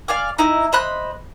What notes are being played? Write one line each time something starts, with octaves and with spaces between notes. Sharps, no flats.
D5 F5 G#5 D6
D#4 E4 D#5
C5 D#5 B5 F#6